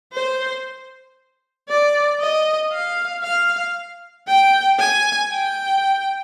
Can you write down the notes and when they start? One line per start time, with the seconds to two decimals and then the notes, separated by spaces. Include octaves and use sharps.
0.13 C5
1.69 D5
2.20 D#5
2.72 F5
3.23 F5
4.28 G5
4.79 G#5
5.31 G5